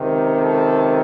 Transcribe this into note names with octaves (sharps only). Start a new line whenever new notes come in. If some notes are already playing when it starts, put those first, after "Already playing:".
Already playing: C#2 C3 D#3
A4